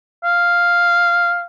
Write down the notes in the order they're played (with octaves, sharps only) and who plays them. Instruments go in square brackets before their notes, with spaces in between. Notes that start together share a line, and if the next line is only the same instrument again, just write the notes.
[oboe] F5